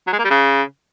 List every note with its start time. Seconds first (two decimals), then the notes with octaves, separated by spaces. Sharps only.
0.07 F#3
0.13 G#3
0.19 A#3
0.25 G3
0.31 C#3